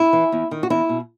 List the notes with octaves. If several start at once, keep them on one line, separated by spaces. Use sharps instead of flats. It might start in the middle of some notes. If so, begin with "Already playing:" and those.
Already playing: E4
E3
E2
D#3
F#4
E2 E4
B2